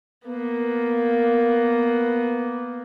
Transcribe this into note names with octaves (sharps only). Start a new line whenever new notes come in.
A#3 B3